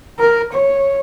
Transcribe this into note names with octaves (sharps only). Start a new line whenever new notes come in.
A#4
C#5